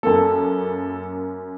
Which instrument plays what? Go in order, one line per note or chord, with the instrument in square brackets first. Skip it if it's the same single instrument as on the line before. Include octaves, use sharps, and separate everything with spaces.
[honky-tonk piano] F#2 A#3 [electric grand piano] A4